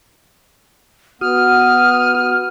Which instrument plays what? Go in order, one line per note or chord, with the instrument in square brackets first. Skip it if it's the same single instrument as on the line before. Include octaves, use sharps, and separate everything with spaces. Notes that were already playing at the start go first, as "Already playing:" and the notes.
[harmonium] B3 [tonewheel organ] F#4 D#6 [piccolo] F6